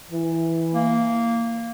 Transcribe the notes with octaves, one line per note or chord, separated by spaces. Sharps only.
E3
A#3